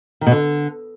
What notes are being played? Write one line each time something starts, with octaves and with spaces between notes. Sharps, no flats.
D#3
B2
D3